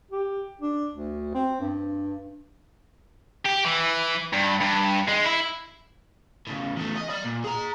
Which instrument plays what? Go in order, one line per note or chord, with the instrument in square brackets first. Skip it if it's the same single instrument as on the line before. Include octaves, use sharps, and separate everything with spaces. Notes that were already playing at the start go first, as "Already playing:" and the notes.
[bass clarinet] G4
D4
D2
C4
G2
[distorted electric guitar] G4
E3
G2
G2
G#3
E4
[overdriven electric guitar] A2 C#3
E2 A3
D#5
D5 B5
A#2
G#4 A#5